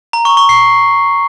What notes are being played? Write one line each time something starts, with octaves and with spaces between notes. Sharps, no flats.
A#5
C#6
C#6
C7